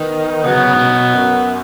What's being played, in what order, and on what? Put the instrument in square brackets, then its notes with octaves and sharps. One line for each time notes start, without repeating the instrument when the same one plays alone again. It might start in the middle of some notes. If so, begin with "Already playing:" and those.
Already playing: [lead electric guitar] D#3 [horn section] B3 D#4
[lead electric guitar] C#3 [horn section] F#3 B3
[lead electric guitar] C#3
C#3
G#2
B2
F#2